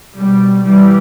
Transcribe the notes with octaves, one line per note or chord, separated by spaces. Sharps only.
B2 G3
E3 G3